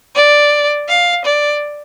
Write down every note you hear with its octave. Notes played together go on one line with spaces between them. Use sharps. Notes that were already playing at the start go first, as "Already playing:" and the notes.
D5
F5
D5